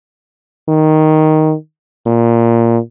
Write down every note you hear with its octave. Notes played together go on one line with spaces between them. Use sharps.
D#3
A#2